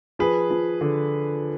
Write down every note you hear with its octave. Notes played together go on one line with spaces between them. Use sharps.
F3 G#4 B4
F3
D3